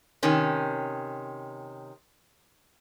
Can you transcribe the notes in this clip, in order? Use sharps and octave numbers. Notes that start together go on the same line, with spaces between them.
C3 D#3 C#4